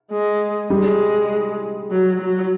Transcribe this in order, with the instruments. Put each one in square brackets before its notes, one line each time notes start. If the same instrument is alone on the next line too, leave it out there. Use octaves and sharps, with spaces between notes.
[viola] G#3
[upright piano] G3 [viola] G#3
[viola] F#3
F#3